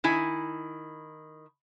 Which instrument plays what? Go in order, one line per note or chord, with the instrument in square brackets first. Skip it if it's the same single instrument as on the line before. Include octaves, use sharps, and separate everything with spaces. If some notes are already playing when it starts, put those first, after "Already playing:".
[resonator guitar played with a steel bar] D#3 E4 G#5